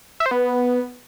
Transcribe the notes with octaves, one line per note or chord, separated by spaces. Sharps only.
E5
C5
B3